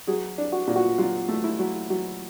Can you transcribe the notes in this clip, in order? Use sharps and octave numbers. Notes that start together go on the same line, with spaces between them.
F#3 G#4
D4
F#4
A#2
F#4
F#3 F4
A3
E4
F#3
F#3